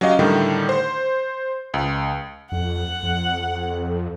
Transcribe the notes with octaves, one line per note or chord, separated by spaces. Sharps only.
F#3 C#4 G4 D#5 F5
A2 D3 D#3 G3
C5
C#2
F2 F#5
F2